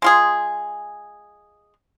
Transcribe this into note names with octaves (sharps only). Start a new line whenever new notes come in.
G#3 F4 G#4